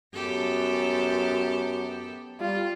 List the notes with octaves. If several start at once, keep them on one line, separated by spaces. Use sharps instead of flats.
F#2 B3 G4 A4
G3 F4